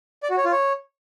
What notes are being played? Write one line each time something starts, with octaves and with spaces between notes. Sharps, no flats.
D5
F#4
C#5
F4
C#5